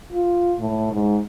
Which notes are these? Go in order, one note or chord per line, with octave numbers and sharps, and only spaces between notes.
F4
A2
G#2